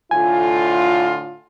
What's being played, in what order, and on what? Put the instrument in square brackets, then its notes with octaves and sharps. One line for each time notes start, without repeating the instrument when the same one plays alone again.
[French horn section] A2 D3 F4 [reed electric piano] G#5